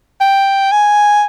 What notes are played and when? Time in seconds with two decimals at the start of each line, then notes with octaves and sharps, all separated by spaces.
0.21 G5
0.72 G#5